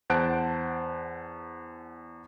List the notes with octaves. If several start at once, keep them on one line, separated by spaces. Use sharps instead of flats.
E2 C5 F#5 A5 F#6 D7